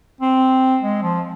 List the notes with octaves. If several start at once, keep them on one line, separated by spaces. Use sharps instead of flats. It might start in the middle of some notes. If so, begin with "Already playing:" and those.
C4
G#3
F3